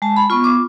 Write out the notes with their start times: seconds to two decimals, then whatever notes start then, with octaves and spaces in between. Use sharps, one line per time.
0.02 G#3 A5
0.17 B5
0.30 B3 F4 C#6
0.44 D6